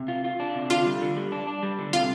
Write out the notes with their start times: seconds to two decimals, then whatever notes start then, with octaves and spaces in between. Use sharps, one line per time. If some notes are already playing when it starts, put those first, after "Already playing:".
Already playing: C3
0.08 F4
0.24 F4
0.40 D4
0.55 C3
0.70 D3 F4 F5
0.86 G3
1.02 D3
1.16 G3
1.32 D4
1.47 D4
1.63 G3
1.79 D3
1.93 C3 F4 F5